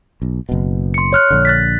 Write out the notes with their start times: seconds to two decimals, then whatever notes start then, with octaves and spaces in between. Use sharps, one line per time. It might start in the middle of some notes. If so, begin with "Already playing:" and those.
0.22 B1
0.49 F#1 B2
0.94 C6 C#7
1.13 C#5 F6 F#6
1.30 A#1 D3
1.45 F#6 A6 B6